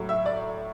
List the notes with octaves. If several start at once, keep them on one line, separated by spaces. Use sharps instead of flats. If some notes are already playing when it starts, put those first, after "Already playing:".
Already playing: A2 F#3
E5
D5